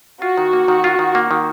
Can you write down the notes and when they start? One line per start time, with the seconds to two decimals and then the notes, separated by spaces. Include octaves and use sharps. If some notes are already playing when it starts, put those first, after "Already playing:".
0.22 F4 F#4
0.37 D#3
0.53 A#3
0.68 D#3
0.84 F4
0.99 D#3
1.15 A#3
1.31 D#3